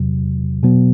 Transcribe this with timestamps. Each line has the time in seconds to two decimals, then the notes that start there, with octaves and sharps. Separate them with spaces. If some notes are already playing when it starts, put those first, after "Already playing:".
Already playing: E2 C3 F#3
0.63 B2 F#3 B3